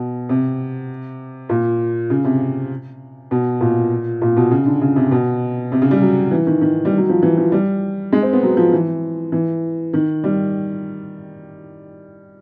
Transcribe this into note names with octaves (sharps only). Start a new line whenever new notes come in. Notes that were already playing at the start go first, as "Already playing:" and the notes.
Already playing: B2
C3
A#2
C#3
C3
B2
A#2
A#2
B2
C#3
D3
C#3
C3
B2
C3
C#3
G3
F#3
E3
D#3
D#3
G3
F#3
F3
E3
F3
G3
G#3
C4
B3
F#3
F3
E3
E3
D#3
G3